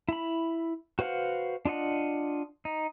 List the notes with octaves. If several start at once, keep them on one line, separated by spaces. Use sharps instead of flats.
E4 B5
F#4 B4 C5 F5 F#5
D4 F4 D#5 F#5
D#4